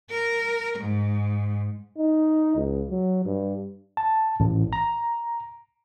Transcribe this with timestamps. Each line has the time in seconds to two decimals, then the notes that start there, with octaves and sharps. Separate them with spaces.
0.10 A#4
0.79 G#2
1.98 D#4
2.56 C#2
2.90 F#3
3.25 G2
3.97 A5
4.40 A1
4.73 A#5